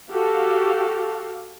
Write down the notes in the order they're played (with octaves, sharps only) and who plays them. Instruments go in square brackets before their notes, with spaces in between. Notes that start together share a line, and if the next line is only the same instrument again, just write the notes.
[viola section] F#4 G4 A4 F5